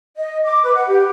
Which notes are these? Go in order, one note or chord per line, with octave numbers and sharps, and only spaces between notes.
D#5
D6
B4
F#5
G4